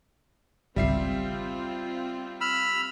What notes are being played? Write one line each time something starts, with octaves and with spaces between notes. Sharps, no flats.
G#1 C#2 G3 C4 F4 E5 C7
B5 E6 F6